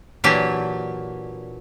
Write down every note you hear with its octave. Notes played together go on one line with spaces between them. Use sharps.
A#2 E3 F#3 D4 G4